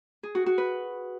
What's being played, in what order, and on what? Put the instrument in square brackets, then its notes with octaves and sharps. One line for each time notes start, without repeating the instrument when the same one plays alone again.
[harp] G#4
F#4
F#4
B4